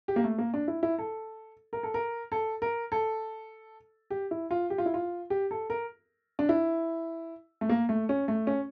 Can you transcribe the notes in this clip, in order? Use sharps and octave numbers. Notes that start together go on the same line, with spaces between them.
G4
A#3
A3
A#3
D4
E4
E4
A4
A#4
A4
A#4
A4
A#4
A4
G4
E4
F4
G4
F4
E4
F4
G4
A4
A#4
D4
E4
A3
A#3
A3
C#4
A3
C#4